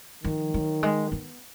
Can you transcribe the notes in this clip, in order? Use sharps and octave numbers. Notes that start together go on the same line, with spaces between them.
D#3 F3
F#3
G#3
B3